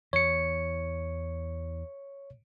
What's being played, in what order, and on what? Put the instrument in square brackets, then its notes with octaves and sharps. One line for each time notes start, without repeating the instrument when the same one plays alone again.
[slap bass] E2 E3 [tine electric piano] C#5 C#7